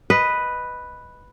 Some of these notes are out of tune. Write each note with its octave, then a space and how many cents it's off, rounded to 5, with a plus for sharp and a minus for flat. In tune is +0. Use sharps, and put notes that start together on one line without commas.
B4 +0 D#5 +0